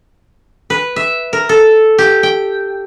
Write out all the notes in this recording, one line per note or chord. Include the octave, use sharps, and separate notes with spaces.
B4
E5
A#4
A4
G4
G5